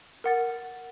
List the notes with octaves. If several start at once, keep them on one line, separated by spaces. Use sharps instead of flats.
A#4 F#5 A6